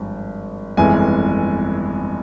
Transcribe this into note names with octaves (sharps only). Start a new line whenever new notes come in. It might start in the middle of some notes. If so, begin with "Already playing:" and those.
Already playing: G#1 G2 F3
G1 F2 E3 G#3 G#5